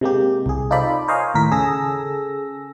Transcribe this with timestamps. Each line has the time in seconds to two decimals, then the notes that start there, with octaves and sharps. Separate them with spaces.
0.01 C3 G#3 A#3 G4
0.46 C2 G#4
0.71 D#4 F4 A4 C5 D5 B5
1.08 A#4 C5 C#5 D#5 F5 G#5
1.34 D#2 A2 A#4 B6
1.51 C#3 G#4 A4 E6 A#6